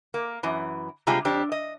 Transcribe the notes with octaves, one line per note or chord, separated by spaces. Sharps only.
A#3
F#2 E3
C3 G3 G#3 F4 G#4
F2 D4 G4 C5
D#5